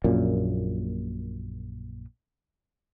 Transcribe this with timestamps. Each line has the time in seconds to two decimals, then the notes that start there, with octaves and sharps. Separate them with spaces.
0.04 A#1 F#2 A#2